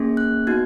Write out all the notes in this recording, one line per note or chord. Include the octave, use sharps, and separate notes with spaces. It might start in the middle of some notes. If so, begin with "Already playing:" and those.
Already playing: A#3 C#4 G#4
F#6
B3 D#4 F#4 G#6